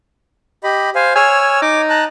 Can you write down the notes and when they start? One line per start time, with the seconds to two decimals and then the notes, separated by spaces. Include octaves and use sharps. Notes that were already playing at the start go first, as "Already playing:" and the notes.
0.64 G4 D#5 B5
0.95 C5 F5 G#5
1.15 C#5 G#5 E6 F6
1.62 D#4 D6
1.90 A5 A#5 F#6